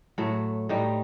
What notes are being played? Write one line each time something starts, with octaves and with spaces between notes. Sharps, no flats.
A2 F#3 A3
A2 G3 D#4